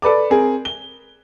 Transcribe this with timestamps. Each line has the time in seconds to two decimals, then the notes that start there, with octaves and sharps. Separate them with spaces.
0.02 A4 B4 D5 D6
0.30 C4 G#4 A#4
0.65 G7